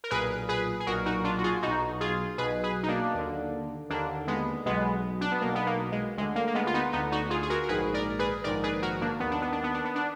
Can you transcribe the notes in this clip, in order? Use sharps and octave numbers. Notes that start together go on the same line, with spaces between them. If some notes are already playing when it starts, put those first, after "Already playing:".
A#4
B1 A#2 G#4 B4
G#4 B4
G#4
B1 A#2 F#4 A#4
D#4 F#4
D4 F4
F#4
F4 G#4
B1 B2 D#4 F#4
F4 G#4
B1 B2 G#4 B4
G#4 B4
D#4
A#3 D4
D#2 D3
D#2 D3 A#3 D4
G#3 B3
B1 B2 G#3 B3
D4
B3
B1 B2 A#3
B3
A#3
G#3
D2 D3 G#3
A#3
A#3
G#3 B3
F4
B3 D#4
D2 D3 B3 D#4
D#4 F#4
F4 G#4
G#4
F#4 A#4
A#4
A#1 G#2 D#3 G#4 B4
A#4 D5
G#4 B4
A#1 G#2 D#3 A#4 D5
G#4 B4
F#4 A#4
A#3 D4
D#2 D#3 B3
D4
B3
D4
B3
D4
B3
D4